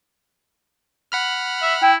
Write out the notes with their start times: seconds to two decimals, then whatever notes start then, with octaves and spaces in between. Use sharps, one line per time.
1.12 F#5 B5 F6
1.62 E5
1.82 E4 G5